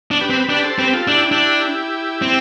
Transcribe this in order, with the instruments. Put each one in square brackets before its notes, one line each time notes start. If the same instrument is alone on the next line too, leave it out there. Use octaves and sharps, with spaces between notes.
[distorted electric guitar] D4
[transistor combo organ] G4 B4
[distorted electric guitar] C4
[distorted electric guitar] D4 [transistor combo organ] G4 B4
[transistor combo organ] A4 C5
[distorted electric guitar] C4 [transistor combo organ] G4 B4
[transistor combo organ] F4 A4
[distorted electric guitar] D4 [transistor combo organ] E4 G4
[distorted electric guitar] D4
C4